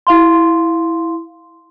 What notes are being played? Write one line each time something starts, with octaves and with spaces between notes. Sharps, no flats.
E4 F5 C6